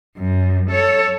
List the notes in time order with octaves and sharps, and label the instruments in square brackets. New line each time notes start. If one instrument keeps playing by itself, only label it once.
[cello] F#2
A4 C#5